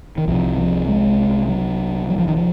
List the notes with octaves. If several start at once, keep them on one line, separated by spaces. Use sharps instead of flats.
D#3
C2 C3 F3
F3
G#3
F#3
F#3
F3
D#3
F3